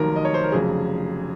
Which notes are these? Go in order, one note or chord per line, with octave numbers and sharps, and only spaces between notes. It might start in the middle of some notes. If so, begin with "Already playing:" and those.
Already playing: F1 D#2 D#3 F#3 A#4
D#5
C#5
C5
A#4
F1 F2 C#3 F#3 G#4